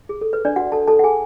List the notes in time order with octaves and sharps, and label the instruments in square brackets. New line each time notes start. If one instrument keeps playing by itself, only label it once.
[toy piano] G#4
A4
B4
D4 D5
F#4 F#5
A4 A5
A4 A5
F#5
G#4 G#5